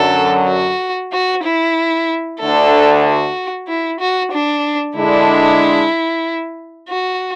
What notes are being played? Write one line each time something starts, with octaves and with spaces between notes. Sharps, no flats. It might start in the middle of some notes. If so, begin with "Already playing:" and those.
Already playing: F#2 D3 F#3 A4
F#4
F#4
E4
D2 D3 A3 D4 A4
F#4
E4
F#4
D4
D3 G#3 D4 E4
F#4